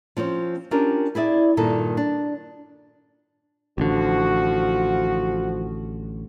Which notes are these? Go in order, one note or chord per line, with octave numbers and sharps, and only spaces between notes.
F3 C4 C#4 C#5
C#4 D4 F4 G4 A#4
E4 G#4 D5 E5
G2 A#2 D#3 A4
D4
A1 D3 F3 F#4